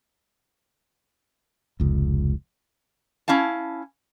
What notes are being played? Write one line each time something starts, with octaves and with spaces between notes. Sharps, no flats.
F1 C#2
C#4 E4 F5 A5